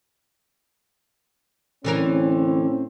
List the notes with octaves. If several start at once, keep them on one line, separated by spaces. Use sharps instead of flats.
A2 D3 E3 C4 C#4 A#4